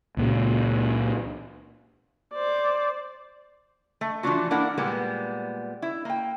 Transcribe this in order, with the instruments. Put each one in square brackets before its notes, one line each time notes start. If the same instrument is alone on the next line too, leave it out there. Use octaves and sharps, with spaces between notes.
[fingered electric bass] C#2 A#2 C#3
[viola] C5 D5
[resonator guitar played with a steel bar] A3
E3 F3 A#3 D4 F4 F#4
A#3 D4 E4 A#4 D5 F#5
A#2 G3 G#3 A#3 B3
E4
A#3 G5